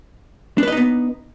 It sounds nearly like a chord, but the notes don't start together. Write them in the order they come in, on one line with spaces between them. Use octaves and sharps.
D4 B4 D#5 D#4 B3